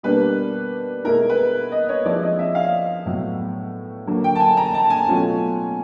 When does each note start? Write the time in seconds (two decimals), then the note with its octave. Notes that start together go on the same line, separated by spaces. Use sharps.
0.03 B2 G3 A#3 D4 B4
1.04 B2 G#3 B3 E4 A#4
1.29 B4
1.72 D#5
1.89 C#5
2.05 F3 G#3 C4 E4 D5
2.23 D#5
2.39 E5
2.55 F5
3.06 A2 F#3 B3
4.07 D3 F#3 A#3
4.24 G5
4.35 A5
4.40 G#5
4.57 A#5
4.74 A5
4.90 G#5
5.08 B2 F#3 A3 C#4 F4